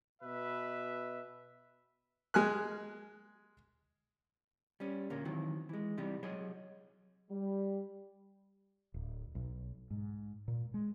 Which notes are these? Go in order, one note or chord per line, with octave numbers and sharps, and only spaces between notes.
B2 B4 E5
G#3 G#5 F6 F#6
G3 C#4
D2 A#2 A#3 C#4
D#3 E3 F#3 C4
E3 G#3
C3 E3 G3 D#4
F#3 G#4 C#5 D#5
G3
D1
B1
G#2
A#2
G#3